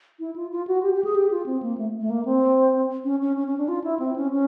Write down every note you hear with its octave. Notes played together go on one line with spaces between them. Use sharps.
E4
F4
F4
F#4
G4
G4
G#4
G4
F4
C4
A#3
A3
A3
A#3
C4
C#4
C#4
C#4
C#4
D4
F4
E4
C4
C#4
C#4